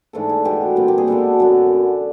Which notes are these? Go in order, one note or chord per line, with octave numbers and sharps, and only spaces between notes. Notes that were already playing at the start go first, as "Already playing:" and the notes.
G#2 E3 A3 D4 A4
G#4
B2 G#3 B3 G4
A#2 G3 C4
G4
G#4
B2 G#3 B3 D4 A4
F#2 D3 F#3